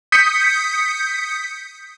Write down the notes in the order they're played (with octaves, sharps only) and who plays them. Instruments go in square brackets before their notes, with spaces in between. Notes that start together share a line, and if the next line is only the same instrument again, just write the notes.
[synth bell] D#6 G6 B6 C#7